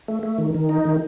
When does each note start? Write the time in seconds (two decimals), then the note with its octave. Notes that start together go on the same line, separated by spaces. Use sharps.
0.08 A3
0.23 A3
0.38 D#3
0.54 D#3
0.69 D#4
0.85 D#3